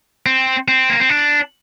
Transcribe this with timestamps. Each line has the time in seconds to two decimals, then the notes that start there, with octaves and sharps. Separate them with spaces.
0.26 C4
0.68 C4
0.90 A#3
1.00 C4
1.09 D4